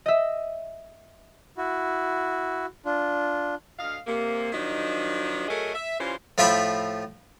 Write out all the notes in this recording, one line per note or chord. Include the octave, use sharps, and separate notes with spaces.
D#5 E5
E4 F#4
D4 F4
D2 D#5 F5
C3 A#3
D#3 F3 F#3 D4 D#4
F#3 A3 G#4 A#4 D#5
E5
E3 G3 C#4 F4 C5
A2 F3 F4 E5 G5 B5